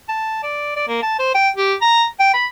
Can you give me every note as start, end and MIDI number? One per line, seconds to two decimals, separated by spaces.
0.09 0.40 81
0.43 0.71 74
0.76 0.85 74
0.88 1.01 58
1.02 1.15 81
1.19 1.31 72
1.35 1.49 79
1.56 1.74 67
1.82 2.05 82
2.20 2.32 79
2.34 2.46 83